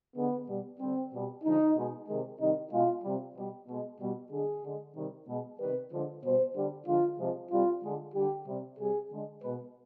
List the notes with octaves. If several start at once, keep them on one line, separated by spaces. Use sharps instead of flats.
D3 G#3 B3
B2 G3
D3 G3 C4
B2 G3
D3 F3 G#3 D#4
B2 G#3
C3 D#3 G#3
C3 D#3 G3 D#4
B2 G#3 F4
C3 G3
B2 G3
B2 G#3
B2 G3
D3 G#3 G#4
D3 G#3
C3 D#3 G3
B2 G#3
C3 D#3 G3 B4
D3 F3 G#3
B2 G3 C5
D3 G3
D3 F3 G#3 F4
C3 F3 G#3
C3 G3 F4
D3 G#3
D3 G3 G4
C3 G3
C3 G3 G#4
D3 G#3
B2 G#3 B4